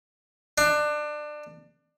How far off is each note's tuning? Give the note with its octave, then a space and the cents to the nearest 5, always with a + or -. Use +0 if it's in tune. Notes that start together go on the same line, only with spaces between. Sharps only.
D4 +25